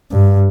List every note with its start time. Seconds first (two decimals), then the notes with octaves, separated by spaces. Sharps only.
0.12 G2